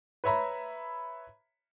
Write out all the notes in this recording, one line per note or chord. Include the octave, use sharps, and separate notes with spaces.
B4 C#5 E5 A#5 B5